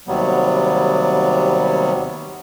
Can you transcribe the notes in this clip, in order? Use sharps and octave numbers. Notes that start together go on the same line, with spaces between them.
D#2 C3 F#3 G3 B3